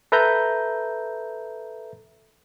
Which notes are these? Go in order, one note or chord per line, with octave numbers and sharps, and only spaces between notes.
A4 B4 E5 A#5 G6